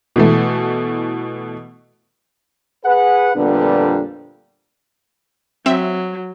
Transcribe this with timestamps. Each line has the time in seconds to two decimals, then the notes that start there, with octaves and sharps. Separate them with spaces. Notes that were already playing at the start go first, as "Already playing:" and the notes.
0.16 B2 E3 A3
2.85 G#4 B4 F#5
3.36 F2 A#2 D3 G3 B3 D4
5.66 F#3 C4 E5